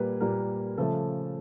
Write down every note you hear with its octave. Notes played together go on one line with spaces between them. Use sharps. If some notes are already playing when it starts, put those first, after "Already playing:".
Already playing: A#2 G3 A#3 B4
A#2 G3 A#3 A#4
C#3 F3 A3 A4